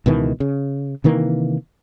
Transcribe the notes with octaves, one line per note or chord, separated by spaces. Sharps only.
C#2 B2 D#3 E3
C#3
C3 D#3 E3 A#3